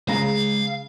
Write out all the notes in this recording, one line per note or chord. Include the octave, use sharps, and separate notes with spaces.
C#3 G#3 F5 A#5